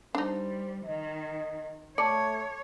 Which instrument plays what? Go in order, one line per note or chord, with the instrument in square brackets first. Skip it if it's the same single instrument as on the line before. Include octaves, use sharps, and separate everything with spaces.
[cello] G3 [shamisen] D4 D#4 [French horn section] C5
[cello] D#3 [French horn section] D#5
[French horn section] A3 [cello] C#5 [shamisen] D5 [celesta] A5 D6 C#7